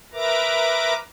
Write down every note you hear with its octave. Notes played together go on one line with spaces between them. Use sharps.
A#4 B4 E5 A#5 D6